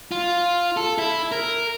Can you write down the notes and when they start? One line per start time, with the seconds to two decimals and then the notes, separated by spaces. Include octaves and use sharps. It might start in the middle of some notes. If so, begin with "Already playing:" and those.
0.11 F4
0.77 A4
0.98 E4
1.32 A#4